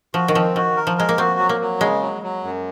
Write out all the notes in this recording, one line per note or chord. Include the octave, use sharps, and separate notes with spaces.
F3 F#4
D#3
F3 C4
D#3 F#4
A#4
F3
G#3 A#4
A#3
C4 F#4
F#3
A#3
F#3
C#3 G#3
F#3
F#3
F#2